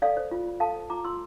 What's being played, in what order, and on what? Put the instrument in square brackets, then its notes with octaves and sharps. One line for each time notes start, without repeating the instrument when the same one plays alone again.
[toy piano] A4 D5 F5
C5
F4
F4
A4 F5 A5
C5
F4 A#5 D6
F4 C6 E6